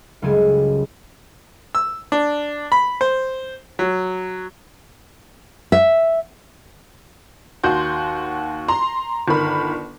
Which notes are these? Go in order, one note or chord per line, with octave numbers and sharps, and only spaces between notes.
F#1 C#2 G3 G#3 A4 G#5
E6
D4
B5
C5
F#3
E5
D#2 F#4 C6 G6
A#5 C6
G1 D#3 A#4 B5